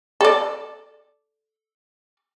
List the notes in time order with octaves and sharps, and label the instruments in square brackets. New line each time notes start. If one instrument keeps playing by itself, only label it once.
[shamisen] A4 D5